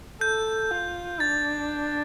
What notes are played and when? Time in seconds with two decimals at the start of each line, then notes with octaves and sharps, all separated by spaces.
0.21 A4 G6
0.71 F4
1.20 D4 A6